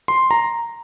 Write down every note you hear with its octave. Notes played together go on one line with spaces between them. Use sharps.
C6
A#5